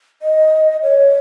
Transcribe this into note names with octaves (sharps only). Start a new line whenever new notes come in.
D#5
C#5